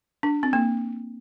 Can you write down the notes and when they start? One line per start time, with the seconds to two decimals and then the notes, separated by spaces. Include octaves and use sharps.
0.23 D4
0.43 C4
0.53 A#3